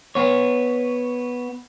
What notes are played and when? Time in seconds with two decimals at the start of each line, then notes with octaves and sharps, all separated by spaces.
0.15 B3 C#5